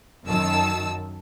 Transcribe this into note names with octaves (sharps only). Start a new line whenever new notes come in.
F#2 D#3 A5 E6